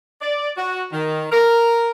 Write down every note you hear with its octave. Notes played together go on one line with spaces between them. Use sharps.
D5
F#4
D#3
A#4